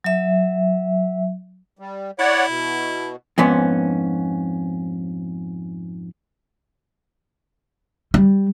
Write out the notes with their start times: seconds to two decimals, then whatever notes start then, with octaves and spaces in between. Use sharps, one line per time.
0.04 F#3 E5
1.79 G3
2.19 E4 C#5 D5 F#5
2.48 B2
3.38 F2 G#2 B3 C#4
8.14 G3